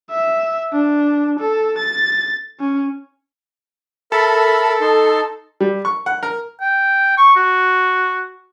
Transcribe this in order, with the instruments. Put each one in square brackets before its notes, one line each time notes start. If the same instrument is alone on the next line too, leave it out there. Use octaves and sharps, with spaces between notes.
[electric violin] E5
D4
A4
A6
C#4
[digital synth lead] A4 [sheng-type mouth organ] A#4 E5 B5
[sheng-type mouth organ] D#4 C6
[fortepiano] G3
C#6
F#5
A#4
[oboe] G5
C#6
F#4